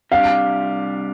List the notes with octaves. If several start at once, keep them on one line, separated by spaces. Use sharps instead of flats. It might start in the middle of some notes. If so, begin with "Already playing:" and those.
C2 C3 G3 D4 G4 F5